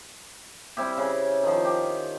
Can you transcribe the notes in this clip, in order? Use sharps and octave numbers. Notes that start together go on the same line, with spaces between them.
G3 C4 E4 G4
C#3
D#3 F3
G4